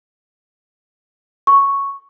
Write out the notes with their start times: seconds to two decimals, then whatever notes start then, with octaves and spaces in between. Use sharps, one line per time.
1.47 C#6